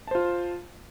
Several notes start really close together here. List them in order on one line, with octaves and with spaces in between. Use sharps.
A5 C5 F4